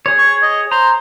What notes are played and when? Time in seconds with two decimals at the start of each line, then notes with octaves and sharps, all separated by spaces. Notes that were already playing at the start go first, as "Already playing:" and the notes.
0.06 G#4 C#5
0.19 C#6
0.43 D#5
0.71 C5 A#5